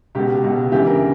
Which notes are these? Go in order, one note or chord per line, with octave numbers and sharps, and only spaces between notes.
C#2 B2 G4
C#2 B2
D2 C#3 E3 G4
A#4